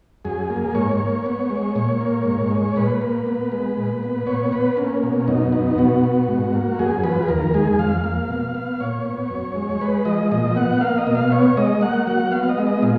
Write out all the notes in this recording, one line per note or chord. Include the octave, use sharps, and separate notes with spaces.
F#2 G#4
A#3
G#2 C#5
A#3
B3
G#3
A#2 C#5
A#3
G#2
G#3
A#2 B4
A#3
B3
G#3
A#2
B3
A#2 C#5
B3 B4
A#3 C#4
B2
F#2 D#4
B3 D#4
B2 F#4
B3
G#2
A#3
F#2 G#4
F3 B4
G#4
D#2 A#4
G#3 G#4
F2 F5
A#3
B2
B3
A#2 C#5
B3
F#2
G#3
G#3 B4
F3 D#5
A#2 D#5
B3 F#5
A#3 F5
D#5
B2
F5
B3 C#5
G#3 D#5
A#3 F#5
F#3 F#5
B3 F5
F5
D#5
G#3
D#5
A#2 F4